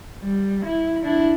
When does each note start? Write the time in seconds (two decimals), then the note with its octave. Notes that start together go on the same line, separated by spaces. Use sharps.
0.22 G3
0.65 E4
1.04 D4 E4